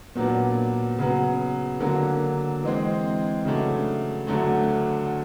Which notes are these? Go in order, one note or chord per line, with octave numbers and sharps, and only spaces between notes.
A#2 F#3 B3 D4
C#3 F#3 B3
D3 F#3 A#3
E3 G#3 C4
C#3 F#3 A3 D4
D2 D3 F#3 A3